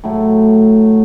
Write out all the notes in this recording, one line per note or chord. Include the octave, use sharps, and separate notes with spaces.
A2 F#3 A3